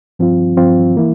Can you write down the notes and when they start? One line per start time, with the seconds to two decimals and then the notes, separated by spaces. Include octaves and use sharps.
0.19 G2 F3 C4 F4
0.57 G2 F3 C4 F4
0.96 E3 A#3 E4